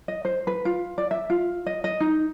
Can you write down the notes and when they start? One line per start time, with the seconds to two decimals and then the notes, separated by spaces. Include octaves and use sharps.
0.08 D#5
0.25 C5
0.47 B4
0.65 F4
0.98 D5
1.11 E5
1.30 F4
1.66 D#5
1.84 D#5
2.00 D#4